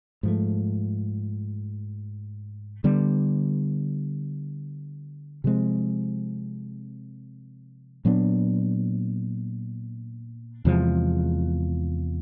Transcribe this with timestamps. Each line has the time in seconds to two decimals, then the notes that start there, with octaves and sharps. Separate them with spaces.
0.23 G#2 F3 A3
2.84 D3 G3 B3
5.44 C3 F3 G#3 C4
8.05 A#2 F#3 B3 D4
10.65 E2 C3 F3 G#3